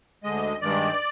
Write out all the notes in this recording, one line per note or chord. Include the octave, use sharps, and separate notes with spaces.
D2 D3 G#3 D#5
G2 D#3 G#3 D5